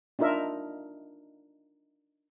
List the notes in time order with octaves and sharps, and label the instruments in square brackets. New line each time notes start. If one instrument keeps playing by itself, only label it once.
[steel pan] D4 D#4 F4 A#4 E5